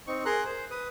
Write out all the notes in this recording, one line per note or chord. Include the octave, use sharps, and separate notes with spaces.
C4 D#4 C#6
G#4 A#4 A#5 C6 F#6
C5
B4 D#6